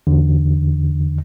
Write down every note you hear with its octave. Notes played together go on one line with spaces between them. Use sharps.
E2 D3